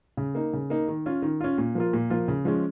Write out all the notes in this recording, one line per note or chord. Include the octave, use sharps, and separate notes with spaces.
C#3
A#3 D#4
C#3
A#3 D#4
D#3
C#4 F4
D#3
C#4 F4
A#2
F3 A#3 F4
A#2
F3 A#3 F4
C#3
F3 G#3 C#4